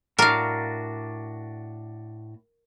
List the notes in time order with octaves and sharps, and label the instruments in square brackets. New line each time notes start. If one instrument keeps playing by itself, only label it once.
[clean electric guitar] A2 D4 F#4 [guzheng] A#4 F5